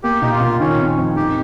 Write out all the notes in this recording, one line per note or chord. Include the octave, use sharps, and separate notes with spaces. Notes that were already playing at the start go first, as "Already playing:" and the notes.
A#3 G4
A#2 D#4
F4
A#2
D#3 C#4
C4
F2
D#4 G4